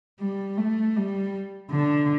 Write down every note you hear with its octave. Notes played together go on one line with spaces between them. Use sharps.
G3
A3
G3
D3